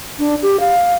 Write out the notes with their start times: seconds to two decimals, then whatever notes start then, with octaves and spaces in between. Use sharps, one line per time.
0.19 D4
0.42 G4
0.60 F5